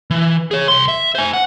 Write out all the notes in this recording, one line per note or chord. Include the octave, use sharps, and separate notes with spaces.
E3
G#4 C#5
C2 C6
E5
C5 G#5
F#5